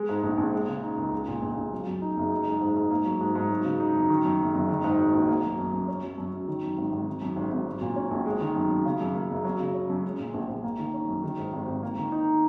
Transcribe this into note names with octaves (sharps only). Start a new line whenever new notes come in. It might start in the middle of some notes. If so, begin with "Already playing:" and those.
Already playing: G#3
G#2
A#1
A#1
G#3
C#3
D#4
C#2
G#3
A#2
A#1
A#1
F#3
F#2
D#4
F#1
D#4
G#3
G#2
G#2
A#3
F#3
G#2
G#2
F#3
C#3
D#4
F#2
D#3
F#2
F#1
F#1
D#3
G#2
F#3
A#1
A#3
F#3
F#2
F#2
C#4
F#3
F#2
F#2
D#3
F#2
G#1
G#1
D#3
F#2
G#1
G#1
F#3
A#2
C#4
A#1
G#3
D#3
F#2
F#2
C#3
F#2
A#3
F#1
F#3
C#3
C#4
F#2
G#3
A#2
A#1
A#1
A#3
D#3
C#4
F#2
D#3
G#2
G#1
G#1
A#3
D#3
D#4